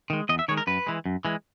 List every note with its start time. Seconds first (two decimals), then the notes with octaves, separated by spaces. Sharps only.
0.10 D#3 G#3
0.29 E2 D#5
0.39 E5
0.48 D#3 G#3 C#5
0.57 A#4
0.67 F#2 B4
0.87 E3 G#3
1.06 F#2
1.25 E3 G#3